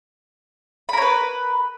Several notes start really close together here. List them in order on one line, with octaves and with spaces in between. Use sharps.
B5 A#4 C#5 B4